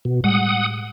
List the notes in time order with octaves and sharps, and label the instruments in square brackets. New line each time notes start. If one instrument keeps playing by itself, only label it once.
[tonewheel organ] B2
[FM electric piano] A2 G3 G#3 [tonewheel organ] F#5 D#6